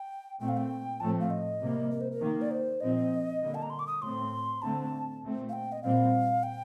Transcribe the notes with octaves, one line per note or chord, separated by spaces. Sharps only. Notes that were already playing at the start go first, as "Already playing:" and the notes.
Already playing: G5
A#2 A3 C4 G5
F5
G5
A2 F3 A3 C4 A5
F5
D#5
C3 G3 A#3
A#4
C5
A#4
D#3 A#3
D5
C5
A#2 F3 C4 D#5
D3 G3 A#3
A5
A#5
C6
D6
D#6
A2 A3 C4 C6
D3 A3 C4 A5
A#2 A3 C4
F5
G5
D#5
A#2 G3 C4 F5
G5